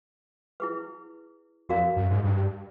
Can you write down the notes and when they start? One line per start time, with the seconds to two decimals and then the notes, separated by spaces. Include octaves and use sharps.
0.60 E4 G#4 B4
1.69 F2 F#4 A#4 D5 F5 A#5
1.96 F#2
2.10 G#2
2.24 G2